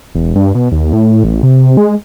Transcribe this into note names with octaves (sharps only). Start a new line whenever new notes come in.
E1
G2
B2
D#2
A2
A1
C3
G#3